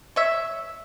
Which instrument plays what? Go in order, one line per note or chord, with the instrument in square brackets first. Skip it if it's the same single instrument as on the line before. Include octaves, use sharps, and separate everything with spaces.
[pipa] C#5 E5